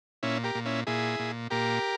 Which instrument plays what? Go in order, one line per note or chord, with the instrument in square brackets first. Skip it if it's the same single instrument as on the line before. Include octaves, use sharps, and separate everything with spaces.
[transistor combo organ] A#2 C#4 E4
G4 A#4
A#2
C#4 E4
A#2 E4 G#4
A#2
A#2 G4 A#4